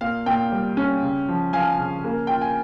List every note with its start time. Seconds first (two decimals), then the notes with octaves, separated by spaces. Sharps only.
0.01 A#2 F5
0.26 A#2 G5
0.52 G3
0.77 C#4
1.02 C#3
1.29 F3
1.53 F3 F5 G#5
1.79 C#3
2.05 A#3
2.27 F4 G5
2.41 G#5